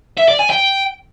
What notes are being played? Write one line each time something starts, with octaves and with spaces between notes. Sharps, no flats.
E5
D5
G#5
G5